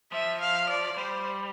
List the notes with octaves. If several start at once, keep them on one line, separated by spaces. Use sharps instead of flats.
F3 E5
F5
D5
G3 C5